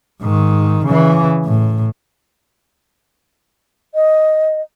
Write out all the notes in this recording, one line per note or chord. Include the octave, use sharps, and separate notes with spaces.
G#2 D#3
C#3 E3
A2
D#5